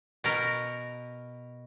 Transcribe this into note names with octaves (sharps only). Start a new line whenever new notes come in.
B2 A#4